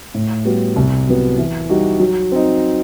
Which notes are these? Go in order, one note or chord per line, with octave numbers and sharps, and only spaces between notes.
A2
G3 B3 F#4
C2
C3 F#3 B3
E3
G3 D#4 F#4
F#3
C4 D#4